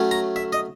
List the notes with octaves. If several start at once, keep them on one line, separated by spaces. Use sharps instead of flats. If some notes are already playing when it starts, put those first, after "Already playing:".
Already playing: F#3 A3 C#4
A#5
E5
D#5